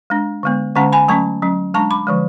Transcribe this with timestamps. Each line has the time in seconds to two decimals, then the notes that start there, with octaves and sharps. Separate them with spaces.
0.10 G#3 D4
0.43 D3 G#3 B3
0.75 D3 G#3 C#4 F#5 A5
0.93 G#5 B5
1.08 F#3 A3 C#4 A5 C#6
1.42 F#3 C#4
1.74 G#3 D4 A5 C#6
1.91 B5 D6
2.07 D3 F3 G#3